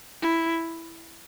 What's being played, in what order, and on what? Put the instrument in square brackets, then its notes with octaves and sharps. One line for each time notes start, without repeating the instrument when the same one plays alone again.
[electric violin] E4